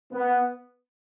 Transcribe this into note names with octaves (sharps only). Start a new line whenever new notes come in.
B3